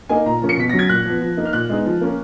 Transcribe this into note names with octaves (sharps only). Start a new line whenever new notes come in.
A#3 D#4 G#5
A#2 A#5
F3 A#3 C#4
C#7
B2 B6
F#3 C#4 A#6
G#6
A#2 F#6
F3 B3
F3
A#3 D#4
F6
A#2 F#6
G#3 B3 D#4
F3
A#3 C#4